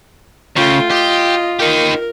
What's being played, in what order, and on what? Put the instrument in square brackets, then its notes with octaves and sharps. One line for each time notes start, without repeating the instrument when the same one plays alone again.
[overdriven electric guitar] C#3 [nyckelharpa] A3 G5 [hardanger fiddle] F4
[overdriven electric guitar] G4 [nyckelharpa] D#5
[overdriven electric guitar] D#4 G4 [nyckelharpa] A#4